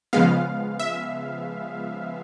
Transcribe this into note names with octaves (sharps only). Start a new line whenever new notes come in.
C#3 F3 G#3 B3 F5
E5